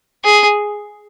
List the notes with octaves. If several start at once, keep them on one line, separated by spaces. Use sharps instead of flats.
G#4